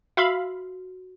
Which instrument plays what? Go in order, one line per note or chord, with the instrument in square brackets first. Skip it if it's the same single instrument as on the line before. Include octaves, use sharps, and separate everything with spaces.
[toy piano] F#4 [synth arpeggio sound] E5 F5 B5